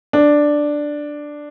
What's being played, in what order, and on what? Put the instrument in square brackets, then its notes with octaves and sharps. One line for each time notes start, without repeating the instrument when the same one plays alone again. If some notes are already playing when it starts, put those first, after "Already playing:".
[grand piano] D4